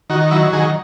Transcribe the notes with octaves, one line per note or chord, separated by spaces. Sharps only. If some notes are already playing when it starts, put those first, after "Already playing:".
D#3 F#4
F#3 E4
D#3 G#4